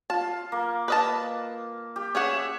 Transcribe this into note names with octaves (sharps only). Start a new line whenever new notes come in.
F4 A5
A#3
B4 D#5 A5
G4
C#4 G#4 C#5 E5 F#5